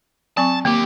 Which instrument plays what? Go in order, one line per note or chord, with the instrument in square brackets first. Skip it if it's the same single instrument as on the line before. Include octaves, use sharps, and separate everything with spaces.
[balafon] F#3 C4 C#6 [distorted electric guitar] A5
[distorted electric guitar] D#2 G4 [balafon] A#3